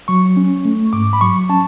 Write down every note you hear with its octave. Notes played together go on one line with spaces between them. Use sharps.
F#3 C#6
C#4
A3
G#2 D6
B5
F#3 C#6
C#4 A5